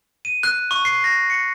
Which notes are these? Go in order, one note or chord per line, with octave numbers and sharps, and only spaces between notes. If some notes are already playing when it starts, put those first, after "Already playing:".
D#7
F#6
C#6
C7
A#6
C#7